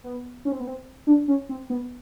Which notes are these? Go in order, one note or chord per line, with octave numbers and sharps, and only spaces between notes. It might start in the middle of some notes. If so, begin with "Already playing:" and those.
B3
C#4
C4
B3
C4
D4
C#4
C4
B3